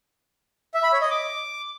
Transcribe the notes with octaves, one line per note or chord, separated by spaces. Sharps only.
E5
B5
C#5
D#5
D6